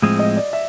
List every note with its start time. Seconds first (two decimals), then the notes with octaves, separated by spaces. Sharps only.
0.02 A2 F3 G#3 C4
0.19 D#5
0.37 D5
0.53 E5